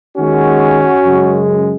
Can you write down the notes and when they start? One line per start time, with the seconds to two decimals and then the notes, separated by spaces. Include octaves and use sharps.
0.17 D#2 D#3 G#3 C#4 F#4
1.05 F#2 C#3 G#3